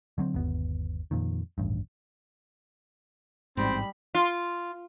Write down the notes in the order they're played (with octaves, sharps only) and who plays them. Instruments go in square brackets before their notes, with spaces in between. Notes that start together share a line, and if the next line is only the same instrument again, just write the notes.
[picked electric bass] D3 F#3 C4
G1 D#2 B3
F2 A#2 D#3
D#1 A1 G2
[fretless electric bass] A1 G#2 [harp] G3 D#4 [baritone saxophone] C4 [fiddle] B5
[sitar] F4